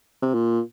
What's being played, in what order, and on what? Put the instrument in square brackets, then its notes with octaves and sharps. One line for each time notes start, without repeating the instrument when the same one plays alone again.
[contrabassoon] C3
A#2